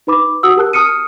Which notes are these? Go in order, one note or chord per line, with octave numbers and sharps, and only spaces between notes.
D#4 B4 B5 D6
F#4 F#5 D#6 E6
G4 A#4 A5 F#6
A5 D#6 F6 C#7 D#7